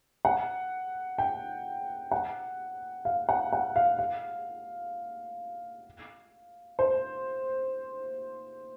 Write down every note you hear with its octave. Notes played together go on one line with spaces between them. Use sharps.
F#5
G5
F#5
F5
F#5
F#5
F5
F5
C5